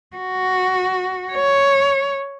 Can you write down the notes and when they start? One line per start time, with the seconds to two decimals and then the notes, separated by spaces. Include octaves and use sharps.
0.16 F#4
1.32 C#5